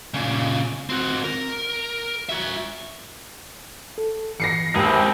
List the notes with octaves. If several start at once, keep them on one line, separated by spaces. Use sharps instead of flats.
A#2 C#3
C4 F#4
A#4
F#4 E5
A4
E3 A#6 C7 C#7
D#2 C3 G#3 C4 D4 E4 G4 G#4